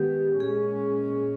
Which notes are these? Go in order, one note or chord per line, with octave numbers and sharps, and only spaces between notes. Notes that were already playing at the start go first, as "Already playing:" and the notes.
Already playing: D#3 G#3 B3 G4
A#2 G#3 C#4 G#4